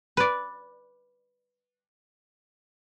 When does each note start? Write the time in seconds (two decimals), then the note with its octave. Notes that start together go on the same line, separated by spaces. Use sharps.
0.17 B4 D5